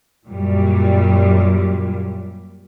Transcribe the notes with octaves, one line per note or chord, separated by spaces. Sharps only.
F#2 A#2 G3